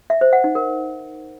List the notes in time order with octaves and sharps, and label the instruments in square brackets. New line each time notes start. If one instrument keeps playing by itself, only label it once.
[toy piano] E5
C5
F#5
D#4
A#4